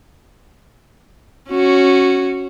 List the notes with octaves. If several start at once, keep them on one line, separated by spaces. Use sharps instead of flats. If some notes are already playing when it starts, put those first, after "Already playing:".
C#4 F#4